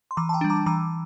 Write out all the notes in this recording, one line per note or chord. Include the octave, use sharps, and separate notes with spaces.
C6
E3 A#5 D6
A5
G5 A#5
G3 D4
A#5 D6
E3 A#5 D6